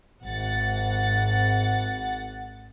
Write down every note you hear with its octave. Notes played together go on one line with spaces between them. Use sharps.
G#1 F#5 A6